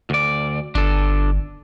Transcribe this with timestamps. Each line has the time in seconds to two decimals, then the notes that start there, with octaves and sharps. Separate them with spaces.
0.10 D2 D5
0.75 G1 D4 A4